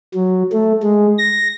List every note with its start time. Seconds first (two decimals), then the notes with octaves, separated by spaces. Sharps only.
0.14 F#3
0.52 A3
0.83 G#3
1.18 A#6